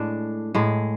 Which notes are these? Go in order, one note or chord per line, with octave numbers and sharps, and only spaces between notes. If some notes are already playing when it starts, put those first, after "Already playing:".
Already playing: A2 G#3 D4
A2 G#3